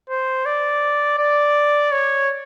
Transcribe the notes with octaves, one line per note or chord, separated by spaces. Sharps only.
C5
D5
D5
C#5